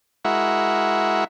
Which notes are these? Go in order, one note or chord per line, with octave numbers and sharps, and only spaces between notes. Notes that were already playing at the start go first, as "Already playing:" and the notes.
G#3 E4 F#4 A#4 E5 F#5